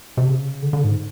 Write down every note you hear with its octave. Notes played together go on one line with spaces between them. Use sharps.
C3
C#3
D3
D3
G#2